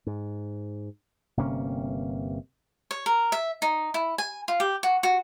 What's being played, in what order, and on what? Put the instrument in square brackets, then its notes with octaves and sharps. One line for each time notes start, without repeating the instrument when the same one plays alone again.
[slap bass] G#2
G1 C3 A#3 C#4
[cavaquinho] C#5
A#4
E5
D#4
E4
G#5
F4
G4
F#4
F#4